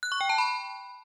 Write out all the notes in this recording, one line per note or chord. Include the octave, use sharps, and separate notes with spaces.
F#6
C#6
G5
A5
B5